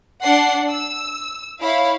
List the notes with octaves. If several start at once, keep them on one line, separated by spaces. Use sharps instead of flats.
D4 F#5 C7
E6
E4 C#5 F5